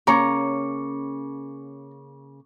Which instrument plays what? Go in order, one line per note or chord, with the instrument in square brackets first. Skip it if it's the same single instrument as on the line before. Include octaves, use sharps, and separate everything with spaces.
[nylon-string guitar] C#3 A#3 C#4 [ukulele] C#5 A#5 [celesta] C#6 D6 C#7